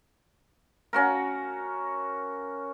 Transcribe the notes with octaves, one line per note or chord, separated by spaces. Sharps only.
C#4 F#4 A#4